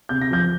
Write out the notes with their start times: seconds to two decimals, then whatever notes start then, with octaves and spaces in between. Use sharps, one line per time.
0.09 C3 G6
0.21 A#6
0.31 F3 G6